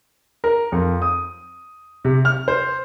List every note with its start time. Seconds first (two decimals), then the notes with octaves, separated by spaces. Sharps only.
0.44 A#4
0.72 F2
1.02 D#6
2.05 C3
2.25 F6
2.48 C5